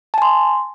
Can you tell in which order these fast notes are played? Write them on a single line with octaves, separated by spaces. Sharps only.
A5 G#5 C6